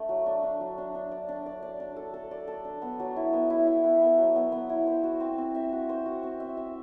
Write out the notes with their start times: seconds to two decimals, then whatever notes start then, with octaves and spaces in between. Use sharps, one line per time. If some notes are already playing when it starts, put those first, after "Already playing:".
Already playing: A3 D4
0.09 F#3
0.26 D4
0.43 D4
0.61 F#3
0.78 D4
0.95 D4
1.11 D5
1.29 D4
1.46 D5
1.62 D5
1.80 D4
1.96 A4
2.14 A4
2.31 D5
2.47 A4
2.65 D4
2.82 B3
3.00 F#3
3.16 E4
3.33 B3
3.50 E4
3.67 E4
3.84 B3
4.01 B3
4.18 F#3
4.36 B3
4.52 B3
4.69 E4
4.87 C5
5.04 F#4
5.20 C4
5.38 C4
5.55 E5
5.72 F#4
5.89 C5
6.06 F#4
6.23 C4
6.40 E5
6.57 E5